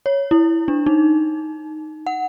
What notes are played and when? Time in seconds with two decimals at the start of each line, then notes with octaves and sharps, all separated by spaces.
0.06 C#5
0.31 E4
0.68 D4
0.86 D#4
2.07 F#5